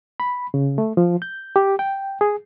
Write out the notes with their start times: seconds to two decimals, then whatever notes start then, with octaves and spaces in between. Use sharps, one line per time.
0.20 B5
0.54 C#3
0.78 A3
0.97 F3
1.22 G6
1.56 G4
1.79 G5
2.21 G#4